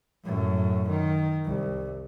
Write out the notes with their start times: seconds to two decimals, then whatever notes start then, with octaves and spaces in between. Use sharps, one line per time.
0.24 F#2 A2
0.89 D#3
1.45 C2